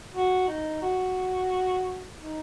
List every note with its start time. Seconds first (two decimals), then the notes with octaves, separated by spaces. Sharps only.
0.13 F#4
0.48 D#4
0.82 F#4
2.21 D#4